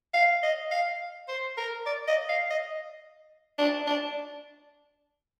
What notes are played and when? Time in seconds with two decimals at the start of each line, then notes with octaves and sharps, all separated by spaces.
0.14 F5
0.43 D#5
0.71 F5
1.28 C5
1.57 A#4
1.86 D5
2.08 D#5
2.29 F5
2.50 D#5
3.58 D4
3.87 D4